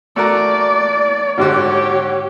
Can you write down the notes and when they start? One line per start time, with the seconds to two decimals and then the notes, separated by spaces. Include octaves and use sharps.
0.16 A3 F#4 A#4 D5
1.38 G#2 D3 F#4 G4 C#5